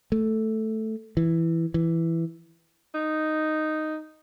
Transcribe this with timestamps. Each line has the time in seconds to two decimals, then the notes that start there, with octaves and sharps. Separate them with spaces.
0.12 A3
1.17 E3
1.74 E3
2.94 D#4